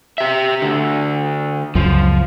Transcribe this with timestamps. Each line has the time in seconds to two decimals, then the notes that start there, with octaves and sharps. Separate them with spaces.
0.18 G4 E5
0.62 D2 D3
1.75 C#2 F#2 F3